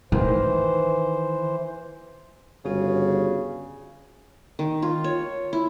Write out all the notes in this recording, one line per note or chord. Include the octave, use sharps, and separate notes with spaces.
D#3 E3 C5
G1 C#3 F#4 G#4 C#5
D#3
F4
C#5
E4